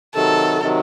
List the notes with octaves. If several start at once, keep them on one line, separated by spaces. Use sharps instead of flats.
C3 D#3 F#3 A4
C3 D#3 F#3